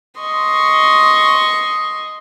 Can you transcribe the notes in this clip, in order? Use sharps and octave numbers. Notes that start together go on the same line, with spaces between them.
D#5 C6 C#6